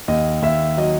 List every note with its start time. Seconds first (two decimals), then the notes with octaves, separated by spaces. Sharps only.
0.08 D#2 D#5
0.42 D#2 E5
0.78 F#3 D#5